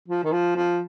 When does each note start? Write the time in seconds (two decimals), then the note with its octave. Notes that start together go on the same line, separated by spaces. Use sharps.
0.09 F3
0.24 D#3
0.32 F3
0.56 F3